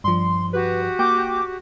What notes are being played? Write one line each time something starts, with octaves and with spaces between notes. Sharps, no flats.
G2 F3 C6
F#4 G4 B4
A#3 G5 D6 G6